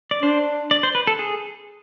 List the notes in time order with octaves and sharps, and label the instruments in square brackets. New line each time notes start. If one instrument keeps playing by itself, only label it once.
[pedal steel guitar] D5
[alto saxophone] D4 [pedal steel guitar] C5
[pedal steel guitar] D5
C5
B4
A4
G#4